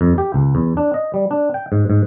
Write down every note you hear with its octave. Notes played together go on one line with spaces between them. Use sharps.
F2
G4
C#2
E2
D4
D#5
G3
D4
G5
G#2
G#2